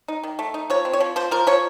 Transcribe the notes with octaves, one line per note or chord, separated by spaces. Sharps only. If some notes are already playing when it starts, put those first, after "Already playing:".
D#4
D#3
A3
D#4
F3 C#5
C4
C#5
F3
F3 C5
F3 A#4
F3 C#5